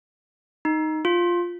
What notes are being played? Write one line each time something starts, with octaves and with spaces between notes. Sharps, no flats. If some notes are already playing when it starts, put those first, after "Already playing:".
D#4
F4